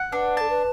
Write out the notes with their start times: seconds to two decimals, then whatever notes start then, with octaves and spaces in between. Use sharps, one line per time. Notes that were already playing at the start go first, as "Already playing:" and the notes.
Already playing: F#5
0.12 D4 B4
0.37 A4 A5
0.50 B4